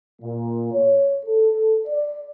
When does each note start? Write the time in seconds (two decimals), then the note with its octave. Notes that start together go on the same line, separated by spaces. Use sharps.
0.22 A#2
0.73 C#5
1.26 A4
1.88 D5